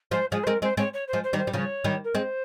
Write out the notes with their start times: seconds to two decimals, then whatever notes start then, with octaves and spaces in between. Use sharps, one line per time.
0.11 F3 G#3 C5
0.31 F3 G#3 G#4
0.43 C5
0.47 G#3 C4 A#4
0.62 G#3 C4 C5
0.77 G#3 C4 C#5
0.93 C#5
1.08 C5
1.13 F3 G#3
1.23 C5
1.33 D#3 G3
1.38 C5
1.47 G3
1.53 C#3 F3 C#5
1.84 D#3 G3
2.04 A#4
2.15 G#3 C4 C5